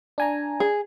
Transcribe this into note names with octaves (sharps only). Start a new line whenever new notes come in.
D4 G#5 A#5
G#4